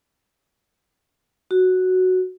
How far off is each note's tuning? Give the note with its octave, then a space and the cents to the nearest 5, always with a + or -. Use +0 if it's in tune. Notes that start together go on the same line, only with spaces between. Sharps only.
F#4 +0